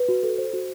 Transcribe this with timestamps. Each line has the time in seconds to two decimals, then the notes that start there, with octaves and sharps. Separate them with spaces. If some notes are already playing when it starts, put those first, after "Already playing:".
Already playing: B4
0.09 F#4
0.23 A4
0.38 C5
0.53 F#4